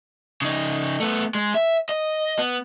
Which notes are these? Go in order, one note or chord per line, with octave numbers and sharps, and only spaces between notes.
C#3 D#4
A3 B3
G#3
E5
D#5
B3